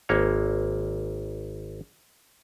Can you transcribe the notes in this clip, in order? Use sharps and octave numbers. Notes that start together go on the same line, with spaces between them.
G#1 A#3 C#5